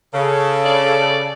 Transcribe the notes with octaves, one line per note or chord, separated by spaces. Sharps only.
C#3 A4
D5